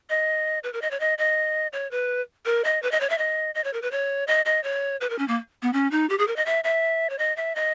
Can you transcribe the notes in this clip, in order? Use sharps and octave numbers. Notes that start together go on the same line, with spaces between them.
D#5
B4
A#4
D#5
C#5
D#5
D#5
C#5
B4
A#4
D#5
B4
D#5
C#5
E5
D#5
D#5
C#5
A#4
B4
C#5
D#5
D#5
C#5
B4
A#4
C#4
A#3
B3
C#4
D#4
G4
G#4
A#4
D#5
E5
E5
C#5
D#5
E5
D#5